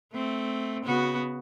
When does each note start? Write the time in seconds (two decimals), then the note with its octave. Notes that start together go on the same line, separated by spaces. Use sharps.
0.13 A3 C4
0.84 C#3 B3 F#4